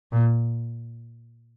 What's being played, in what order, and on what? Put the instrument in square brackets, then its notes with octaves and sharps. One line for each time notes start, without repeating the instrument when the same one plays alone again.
[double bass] A#2